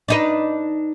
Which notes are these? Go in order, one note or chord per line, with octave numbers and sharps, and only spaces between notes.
D4 D#4 B4